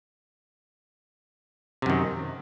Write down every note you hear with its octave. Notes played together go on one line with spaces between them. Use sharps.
F#2 C3 D#3